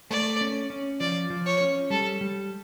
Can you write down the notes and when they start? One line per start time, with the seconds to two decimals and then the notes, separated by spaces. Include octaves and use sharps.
0.11 A3 D5
0.41 C#4
0.70 C#4
1.00 F3 D5
1.30 F3
1.46 C#5
1.61 C#4
1.90 G3 A4
2.21 G3